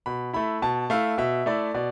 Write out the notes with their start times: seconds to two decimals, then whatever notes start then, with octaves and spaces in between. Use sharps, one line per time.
0.06 B2 B5
0.33 A3 E4 B5
0.62 B2 A5
0.90 A3 E4 F5
1.18 B2 E5
1.46 A3 E4 D5
1.74 B2 D5